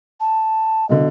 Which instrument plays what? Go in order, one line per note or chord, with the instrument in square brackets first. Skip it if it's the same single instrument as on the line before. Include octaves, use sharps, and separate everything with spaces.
[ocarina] A5
[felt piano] B1 D3 [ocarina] D#5